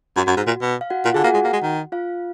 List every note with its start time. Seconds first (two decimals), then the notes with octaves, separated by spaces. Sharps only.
0.17 F#2 F#4
0.27 F#2
0.37 G#2
0.47 A#2
0.61 B2
0.81 F5
0.90 F#4 F#5
1.05 A#2 F4 F5
1.14 D3 G#4 G#5
1.24 A#3 F#4 F#5
1.34 G#3
1.44 A#3
1.53 G#3
1.63 D#3
1.92 F4 F5